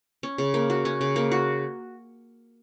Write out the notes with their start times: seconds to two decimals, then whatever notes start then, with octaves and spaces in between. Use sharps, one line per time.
0.23 C#4
0.38 C#3
0.54 A#3
0.70 F#4
0.85 C#4
1.01 C#3
1.16 A#3
1.32 F#4